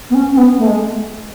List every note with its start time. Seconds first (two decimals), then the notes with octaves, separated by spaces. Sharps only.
0.10 B3
0.14 C#4
0.32 C#4
0.37 B3
0.58 A3
0.66 G#3